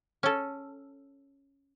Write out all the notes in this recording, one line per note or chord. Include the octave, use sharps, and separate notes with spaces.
C#4 A4